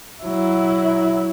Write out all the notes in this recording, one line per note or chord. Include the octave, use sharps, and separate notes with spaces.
F#3 E4